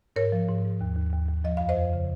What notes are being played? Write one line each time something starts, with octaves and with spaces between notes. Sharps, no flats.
G#2 A#4 C#5
F3
G#2
G#2
D#2
D#2
D#2
D#2
F3 D#5
F2 F5
C5 D#5
F2
C#3